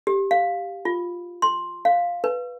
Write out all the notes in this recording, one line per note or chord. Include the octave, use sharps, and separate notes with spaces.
G4
F5
F4
C6
F5
B4